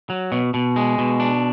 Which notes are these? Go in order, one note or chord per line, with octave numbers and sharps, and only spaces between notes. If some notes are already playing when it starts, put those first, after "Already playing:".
F#3
B2
B2
G#3
B2
D4